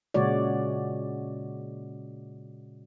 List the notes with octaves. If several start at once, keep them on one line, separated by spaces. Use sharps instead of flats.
A#2 C#3 G#3 F#4 C#5 D5